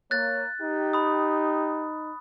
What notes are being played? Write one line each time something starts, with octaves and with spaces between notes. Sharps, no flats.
A#3 C#5 F#6 A6
D#4 G4
B5 D#6